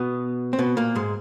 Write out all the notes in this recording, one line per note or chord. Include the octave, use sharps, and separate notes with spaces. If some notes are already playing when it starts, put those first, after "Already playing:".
Already playing: B2 B3
C4
B2 B3
A#2 A#3
G#2 G#3